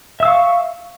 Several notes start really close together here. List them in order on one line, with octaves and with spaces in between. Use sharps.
E5 E6 F5 C#6